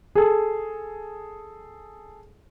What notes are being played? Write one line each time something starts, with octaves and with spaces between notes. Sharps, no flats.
G#4 A4